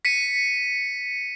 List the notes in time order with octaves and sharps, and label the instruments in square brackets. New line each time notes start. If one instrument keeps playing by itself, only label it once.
[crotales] B6 C#7 D#7